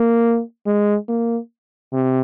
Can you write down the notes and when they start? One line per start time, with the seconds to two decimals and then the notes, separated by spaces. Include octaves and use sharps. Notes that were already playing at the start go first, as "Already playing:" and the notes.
Already playing: A#3
0.66 G#3
1.08 A#3
1.93 C3